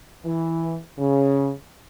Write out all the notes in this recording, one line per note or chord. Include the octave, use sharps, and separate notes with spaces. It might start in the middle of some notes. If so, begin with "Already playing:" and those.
E3
C#3